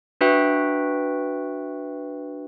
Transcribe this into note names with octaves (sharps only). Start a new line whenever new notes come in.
D4 F#4 B4 E5 G5